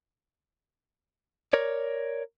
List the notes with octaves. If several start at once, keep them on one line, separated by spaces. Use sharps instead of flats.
A#4 C#5 D5